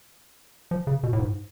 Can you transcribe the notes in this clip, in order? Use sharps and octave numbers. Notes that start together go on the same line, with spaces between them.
F3
C#3
B2
A2
G#2